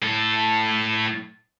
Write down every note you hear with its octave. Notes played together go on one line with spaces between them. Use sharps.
A2 A4